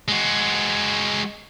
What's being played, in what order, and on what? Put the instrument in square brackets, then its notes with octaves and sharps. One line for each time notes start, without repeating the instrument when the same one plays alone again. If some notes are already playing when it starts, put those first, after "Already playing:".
[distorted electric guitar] G#3 F#4